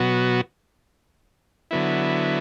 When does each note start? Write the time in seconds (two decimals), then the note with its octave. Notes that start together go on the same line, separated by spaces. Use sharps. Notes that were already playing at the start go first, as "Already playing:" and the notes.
Already playing: B2 F#3 B3 F#4
1.71 D3 F#3 B3 E4